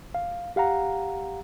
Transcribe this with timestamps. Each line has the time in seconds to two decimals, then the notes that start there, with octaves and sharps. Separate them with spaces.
0.15 F5
0.56 G4 F5 F#5 A#5